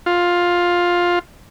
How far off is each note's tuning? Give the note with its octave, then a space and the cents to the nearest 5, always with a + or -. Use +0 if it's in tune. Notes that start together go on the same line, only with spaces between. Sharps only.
F4 +10